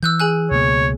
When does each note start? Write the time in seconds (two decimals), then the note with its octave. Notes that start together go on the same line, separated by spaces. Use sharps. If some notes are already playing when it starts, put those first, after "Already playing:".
0.03 E3 E6 F#6 G6
0.20 G#4 G#5 F#6
0.51 C#2 B2 A#3 C#5